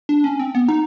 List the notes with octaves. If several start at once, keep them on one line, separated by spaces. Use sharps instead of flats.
D4
C#4
C4
B3
D#4